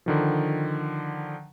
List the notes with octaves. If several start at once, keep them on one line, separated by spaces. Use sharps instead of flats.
D3 D#3 F3